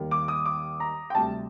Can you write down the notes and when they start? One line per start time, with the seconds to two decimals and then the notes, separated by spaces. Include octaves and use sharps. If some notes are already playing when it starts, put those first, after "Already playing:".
Already playing: D#2 D#3 G3
0.11 D6
0.28 D#6
0.46 D6
0.80 A#5
1.10 G5
1.15 D2 C3 G3 A5